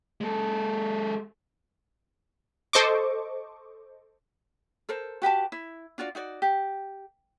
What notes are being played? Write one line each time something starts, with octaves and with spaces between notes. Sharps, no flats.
G#3 A4
A4 C5 D#5 C#6 D6
A4 A#4 C5
F#4 G4 B4 A5
E4
D4 F4 F#4 D5
D#4 F#4 D5
G4